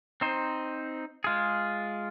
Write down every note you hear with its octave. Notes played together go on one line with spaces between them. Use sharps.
C4 D#4 C5
G#3 F4 G#4